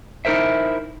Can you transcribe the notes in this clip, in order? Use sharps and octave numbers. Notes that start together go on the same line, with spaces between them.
D#4 E4 A#4 C5 E5